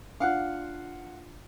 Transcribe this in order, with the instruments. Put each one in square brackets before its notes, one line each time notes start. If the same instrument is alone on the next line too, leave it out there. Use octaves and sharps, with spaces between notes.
[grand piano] D4 F4 [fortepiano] F5 F#5